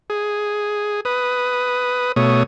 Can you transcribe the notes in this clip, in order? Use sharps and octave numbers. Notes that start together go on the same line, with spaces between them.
G#4
B4 D#6
B2 A3 C#5 D#6